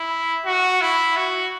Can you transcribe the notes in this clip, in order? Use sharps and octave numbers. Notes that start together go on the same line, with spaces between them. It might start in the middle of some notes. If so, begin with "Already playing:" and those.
Already playing: E4
F#4
E4
F#4